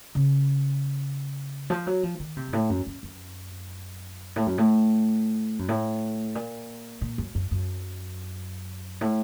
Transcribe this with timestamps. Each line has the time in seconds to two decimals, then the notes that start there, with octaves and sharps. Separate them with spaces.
0.15 C#3
1.70 F3
1.87 F#3
2.03 F3
2.19 D#3
2.37 C3
2.48 F#2
2.53 A2
2.70 F#2
2.87 F#2
3.03 F#2
4.36 A2
4.47 F#2
4.58 A2
5.59 F#2
5.69 A2
6.35 A#2
7.01 A#2
7.18 F#2
7.35 F#2
7.51 F#2
9.01 A2